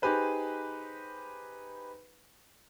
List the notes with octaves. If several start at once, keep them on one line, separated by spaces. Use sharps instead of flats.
D#4 G4 G#4 B4 C5